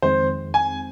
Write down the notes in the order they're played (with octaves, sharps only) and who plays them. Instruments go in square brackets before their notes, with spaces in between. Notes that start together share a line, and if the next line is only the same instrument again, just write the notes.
[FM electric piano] F2 D#3 G#3 C4 [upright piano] C5
[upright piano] G#5